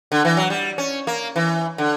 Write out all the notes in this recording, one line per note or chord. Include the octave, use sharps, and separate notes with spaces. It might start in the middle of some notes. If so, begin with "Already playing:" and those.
D3
E3
F#3
G3
C#4
A#3
E3
D3